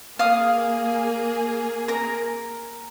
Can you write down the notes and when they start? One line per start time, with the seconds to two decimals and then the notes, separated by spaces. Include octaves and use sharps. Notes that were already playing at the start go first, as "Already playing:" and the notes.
0.19 A#3 G#4 F5 D#6
1.88 A#4 A#5